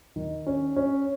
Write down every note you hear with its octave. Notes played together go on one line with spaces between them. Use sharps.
D#3
C#4
C#4